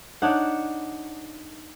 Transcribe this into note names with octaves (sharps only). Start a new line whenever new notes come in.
D4 D#4 C#5 F#5